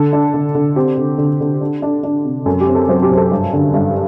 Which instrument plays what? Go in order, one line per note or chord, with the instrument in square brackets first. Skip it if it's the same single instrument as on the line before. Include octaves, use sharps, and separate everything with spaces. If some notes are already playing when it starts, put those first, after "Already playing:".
Already playing: [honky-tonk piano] D3 A4
D4
D3
D3
C4 G4
D3
D3
D3
D4
D4
D4
C3
F#2 A4
G4
C4
A4
F#3 C5
G4
F#2
A4
G2
D3
G2